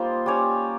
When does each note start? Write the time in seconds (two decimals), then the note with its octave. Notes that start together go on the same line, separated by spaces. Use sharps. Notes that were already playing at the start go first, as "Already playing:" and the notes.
Already playing: G3 A#3 D#4 F4 C5
0.26 G3 C#4 G4 C#5